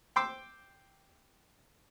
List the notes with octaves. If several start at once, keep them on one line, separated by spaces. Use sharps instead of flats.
G5 C6 D6 E6